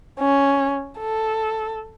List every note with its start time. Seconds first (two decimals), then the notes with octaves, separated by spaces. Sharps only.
0.20 C#4
0.99 A4